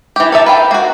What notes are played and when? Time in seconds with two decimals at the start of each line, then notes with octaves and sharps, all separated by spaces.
0.16 E3 G4
0.32 A4 A#4 E5 A5
0.46 B4 F5 G5
0.71 A#3 F#4